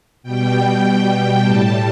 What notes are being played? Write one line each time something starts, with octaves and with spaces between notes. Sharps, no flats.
B2 G3 G5
A2 G3 A5